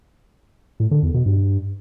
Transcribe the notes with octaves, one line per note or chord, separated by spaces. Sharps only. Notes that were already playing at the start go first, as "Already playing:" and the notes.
A2
D3
E2
B2
G2